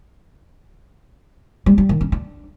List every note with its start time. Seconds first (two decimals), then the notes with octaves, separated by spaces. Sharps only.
1.66 G3
1.78 G3
1.89 D#3
2.01 C#4
2.12 D4